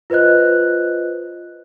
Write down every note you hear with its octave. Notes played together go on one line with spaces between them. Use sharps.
F4 B4 C5 D#5 F#6